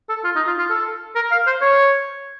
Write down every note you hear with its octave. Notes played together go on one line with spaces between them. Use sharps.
A4
F4
D#4
F4
F4
A4
A#4
F5
C5
C#5